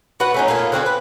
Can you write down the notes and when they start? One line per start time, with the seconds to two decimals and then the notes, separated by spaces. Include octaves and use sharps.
0.20 F#4 B4 F#5
0.34 A3 C#4 D#4
0.48 A3 A#3 F4 G#4
0.72 D3 C4 F#4 G#4
0.86 B4